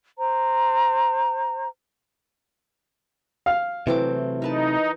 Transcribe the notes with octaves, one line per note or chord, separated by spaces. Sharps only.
C5 A#5
F5
C3 E3 F#3 A3 C4 D6
D#4 A#4 B4 A5